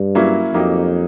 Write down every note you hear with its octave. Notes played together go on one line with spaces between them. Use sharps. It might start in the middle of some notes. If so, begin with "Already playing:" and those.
Already playing: G2
F#3 A#3 C#4 E4
F2 F#3 A#3 D#4 G4